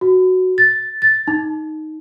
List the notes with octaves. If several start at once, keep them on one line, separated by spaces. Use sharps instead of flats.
F#4
A6
A6
D#4